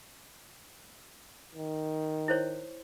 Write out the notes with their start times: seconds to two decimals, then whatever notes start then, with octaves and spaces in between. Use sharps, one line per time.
1.55 D#3
2.28 E4 C5 C#5